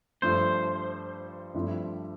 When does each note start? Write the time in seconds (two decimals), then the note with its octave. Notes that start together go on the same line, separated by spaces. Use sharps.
0.22 G2 F3 A3 C5
1.54 G2 F3 A3 C4 E4